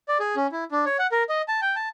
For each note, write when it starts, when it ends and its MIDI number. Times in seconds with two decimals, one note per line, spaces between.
0.08 0.18 74
0.20 0.35 68
0.36 0.47 61
0.52 0.64 64
0.72 0.85 62
0.86 0.97 73
0.99 1.07 78
1.12 1.23 70
1.29 1.42 75
1.48 1.60 81
1.62 1.75 79
1.76 1.89 81